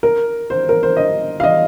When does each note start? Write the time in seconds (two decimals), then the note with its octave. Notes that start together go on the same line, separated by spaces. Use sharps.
0.03 A#4
0.50 C5
0.69 A#4
0.83 C5
0.97 D#5
1.40 F5
1.44 D#5